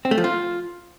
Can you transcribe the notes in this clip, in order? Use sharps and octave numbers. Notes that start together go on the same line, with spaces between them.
C4
A3
F3
F4